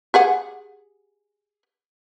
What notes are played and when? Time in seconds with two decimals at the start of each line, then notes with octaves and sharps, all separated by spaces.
0.14 G4 G#4 F#5